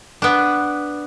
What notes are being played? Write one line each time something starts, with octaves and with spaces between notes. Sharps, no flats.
B3 D4